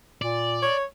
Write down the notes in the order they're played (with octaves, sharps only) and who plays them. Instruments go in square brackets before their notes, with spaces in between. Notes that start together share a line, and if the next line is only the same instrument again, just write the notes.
[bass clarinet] A#2 [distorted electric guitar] D5
[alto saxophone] C#5